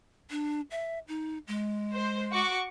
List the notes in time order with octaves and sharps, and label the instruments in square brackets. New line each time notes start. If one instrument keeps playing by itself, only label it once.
[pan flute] D4
E5
D#4
G#3
[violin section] C5
F#4 C#6 D6